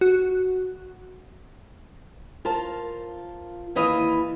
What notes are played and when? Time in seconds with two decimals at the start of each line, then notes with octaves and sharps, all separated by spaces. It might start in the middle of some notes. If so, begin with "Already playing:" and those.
0.01 F#4
2.45 F4 A#4 C5 A5
3.75 D#2 E3 B4 D#5 F5